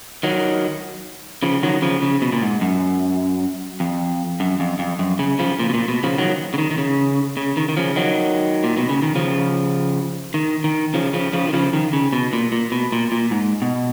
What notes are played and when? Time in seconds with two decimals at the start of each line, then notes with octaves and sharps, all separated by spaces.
0.23 D#3 F#3
1.43 C#3 F3
1.63 D#3 F#3
1.82 C#3 F3
2.02 C#3
2.22 B2
2.32 A#2
2.42 G#2
2.61 F#2
3.80 F2
4.40 F#2
4.60 F2
4.79 F2
4.99 F#2
5.19 C#3
5.39 C#3 F3
5.59 A#2
5.69 B2
5.74 A#2
5.88 B2
6.03 C#3 F3
6.18 D#3 F#3
6.54 C#3
6.58 D#3
6.71 D#3
6.78 C#3
7.37 C#3
7.57 D#3
7.69 D#3
7.77 C#3 F3
7.96 D#3 F#3
8.64 A#2
8.77 B2
8.89 C#3
9.02 D#3
9.15 C#3 F3
10.34 D#3
10.64 D#3
10.94 C#3 F3
11.14 C#3 F3
11.33 C#3 F3
11.48 D#3
11.53 C#3 F3
11.73 D#3
11.93 C#3
12.13 B2
12.33 A#2
12.52 A#2
12.72 B2
12.92 A#2
13.12 A#2
13.31 G#2
13.62 B2